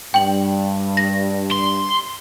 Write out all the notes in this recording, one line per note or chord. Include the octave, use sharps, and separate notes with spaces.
G2 G5 F#7
A#6
C6